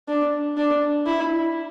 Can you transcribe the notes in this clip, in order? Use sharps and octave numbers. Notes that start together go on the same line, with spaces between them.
D4
D4
E4